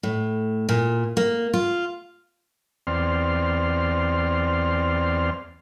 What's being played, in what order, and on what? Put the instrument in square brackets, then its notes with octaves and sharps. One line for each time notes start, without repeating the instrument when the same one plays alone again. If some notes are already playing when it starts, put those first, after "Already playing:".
[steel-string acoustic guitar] A2
A#2
A#3
F4
[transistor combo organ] E2 C4 D5 C6 F6